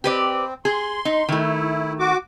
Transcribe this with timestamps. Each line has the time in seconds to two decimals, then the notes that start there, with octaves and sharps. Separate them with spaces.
0.04 C4 G4 B4 D5
0.65 G#4 C6
1.05 D#4
1.29 D#3 A3 E4
1.99 F#4 D6